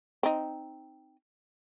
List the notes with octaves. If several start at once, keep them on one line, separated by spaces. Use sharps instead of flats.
C4 D#4